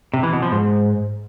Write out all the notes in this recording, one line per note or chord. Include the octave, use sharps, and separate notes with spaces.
C3
E3
B2
F3
G#2